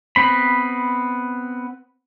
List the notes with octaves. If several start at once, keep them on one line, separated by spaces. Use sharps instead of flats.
B3 C4 B5